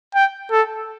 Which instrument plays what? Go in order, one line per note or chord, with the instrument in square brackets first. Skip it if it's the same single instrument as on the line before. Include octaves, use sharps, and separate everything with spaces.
[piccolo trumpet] G5
A4